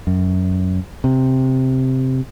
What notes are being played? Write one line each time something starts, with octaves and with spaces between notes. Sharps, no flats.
F#2
C3